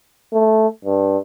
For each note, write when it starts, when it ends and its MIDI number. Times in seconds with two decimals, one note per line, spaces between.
0.33 0.68 57
0.85 1.17 43